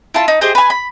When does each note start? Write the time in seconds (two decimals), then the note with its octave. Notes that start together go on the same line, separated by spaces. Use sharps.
0.14 E4 F4 A5
0.28 D#4
0.41 G4 G#4 C5 D#5
0.55 B4 G#5
0.70 B5